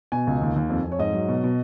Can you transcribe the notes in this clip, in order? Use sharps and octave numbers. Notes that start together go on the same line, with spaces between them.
B2 G#5
C#2
D#2
D#2
F2
F2
C#5
G#2 D#5
F#3
B2
B2